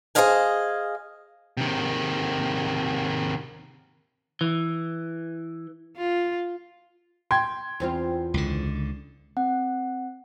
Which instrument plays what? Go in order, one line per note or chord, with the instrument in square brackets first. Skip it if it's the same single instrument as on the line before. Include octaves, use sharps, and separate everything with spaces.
[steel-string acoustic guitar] G#4 A#4 C5 D#5 F5 G#5
[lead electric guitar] C3 D#3
[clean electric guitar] E3
[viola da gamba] F4
[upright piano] G5 C6 G#6
[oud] E2 C4 F4
[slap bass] C#2 D3
[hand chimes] C4 F#5